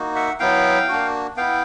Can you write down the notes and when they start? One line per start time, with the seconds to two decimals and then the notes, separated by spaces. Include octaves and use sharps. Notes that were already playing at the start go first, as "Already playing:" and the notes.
Already playing: A#3 D#4 F#4
0.15 E5 F#5
0.40 F#3 B3 E4 F5 G5
0.89 A#3 D4 F#4
1.37 B3 E4 F5 G5